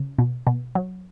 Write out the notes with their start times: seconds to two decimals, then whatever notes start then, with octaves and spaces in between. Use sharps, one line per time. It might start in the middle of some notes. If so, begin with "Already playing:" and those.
Already playing: C#3
0.18 B2
0.47 B2
0.75 F#3